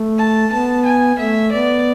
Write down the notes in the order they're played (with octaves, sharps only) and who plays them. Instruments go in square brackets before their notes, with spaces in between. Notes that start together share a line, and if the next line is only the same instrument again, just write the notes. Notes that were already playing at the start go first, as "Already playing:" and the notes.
Already playing: [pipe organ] A3
[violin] A5
[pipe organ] B3 [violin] A5
[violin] G#5
[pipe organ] A3 [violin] E5
[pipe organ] B3 [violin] D5